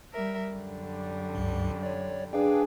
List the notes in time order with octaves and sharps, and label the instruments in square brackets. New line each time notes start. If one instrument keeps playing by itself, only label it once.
[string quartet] G3 A#4 E5
F#2 D3 G3
[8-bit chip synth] C#2 G2
C#5 D5
[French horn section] D4 G#4 [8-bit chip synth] B4 F5 G5